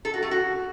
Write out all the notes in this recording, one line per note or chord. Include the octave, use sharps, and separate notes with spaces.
A4
F#4
A3
F#4